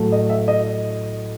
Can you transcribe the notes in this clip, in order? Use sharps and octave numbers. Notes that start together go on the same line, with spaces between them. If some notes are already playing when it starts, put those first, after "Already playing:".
Already playing: A2 F#3 A3
D#5
E5
D#5